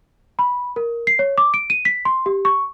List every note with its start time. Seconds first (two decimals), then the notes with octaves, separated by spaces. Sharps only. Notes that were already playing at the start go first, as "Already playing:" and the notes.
0.39 B5
0.76 A#4
1.07 C7
1.19 C#5
1.38 D6
1.54 D7
1.70 D#7
1.85 B6
2.05 C6
2.26 G4
2.45 C#6